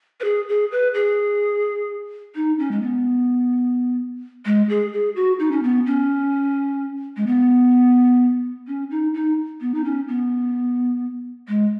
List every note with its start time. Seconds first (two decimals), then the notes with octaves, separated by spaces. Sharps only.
0.20 B4
0.24 G#4
0.48 G#4
0.72 B4
0.94 G#4
2.35 D#4
2.59 C#4
2.71 G#3
2.82 B3
4.46 G#3
4.69 G#4
4.93 G#4
5.16 F#4
5.39 D#4
5.51 C#4
5.63 B3
5.86 C#4
7.17 G#3
7.27 B3
8.67 C#4
8.91 D#4
9.14 D#4
9.61 B3
9.74 D#4
9.84 C#4
10.08 B3
11.48 G#3